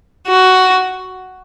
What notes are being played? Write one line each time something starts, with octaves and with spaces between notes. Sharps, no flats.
F#4